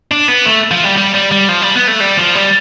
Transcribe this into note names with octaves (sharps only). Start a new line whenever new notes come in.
D4
B3
A3
F3
G3
G3
G3
G3
F3
G3
B3
A3
G3
F3
G3